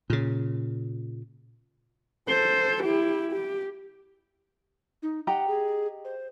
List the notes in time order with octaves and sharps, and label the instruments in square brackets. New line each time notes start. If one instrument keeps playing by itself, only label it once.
[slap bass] A#2 C#3
[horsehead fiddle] A4 C5
E4 G4
G4
[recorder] D#4
[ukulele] G4 D#5 A#5 [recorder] F#5
[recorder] G#4
C5